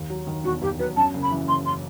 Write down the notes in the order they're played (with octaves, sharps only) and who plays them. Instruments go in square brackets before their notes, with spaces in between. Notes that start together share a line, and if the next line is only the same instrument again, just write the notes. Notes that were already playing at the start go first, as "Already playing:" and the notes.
Already playing: [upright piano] D#2
F#3
D#3
[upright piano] E1 [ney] F#4
[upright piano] D#2 [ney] G4
[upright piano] F#3 [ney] B4
[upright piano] F#2 [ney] A5
[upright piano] F#1
[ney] B5
[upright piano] E3
[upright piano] F#1 [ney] C6
[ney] C6